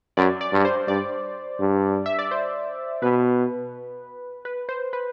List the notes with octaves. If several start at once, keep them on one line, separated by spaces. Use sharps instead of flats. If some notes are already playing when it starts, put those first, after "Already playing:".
F#2 D5
D5
G2
C5
G2 D5
G2
E5
D5
C5
B2 B4
B4
C5
B4